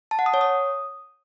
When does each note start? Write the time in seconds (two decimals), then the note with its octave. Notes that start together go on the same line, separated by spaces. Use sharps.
0.11 A5
0.19 F#5
0.26 D#6
0.34 C#5
0.41 D#6